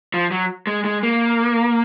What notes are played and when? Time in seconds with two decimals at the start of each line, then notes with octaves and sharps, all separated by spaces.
0.14 F3
0.31 F#3
0.67 G#3
0.85 G#3
1.03 A#3